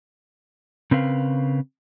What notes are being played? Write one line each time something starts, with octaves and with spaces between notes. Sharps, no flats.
C#3 C4 A#4 B4 F5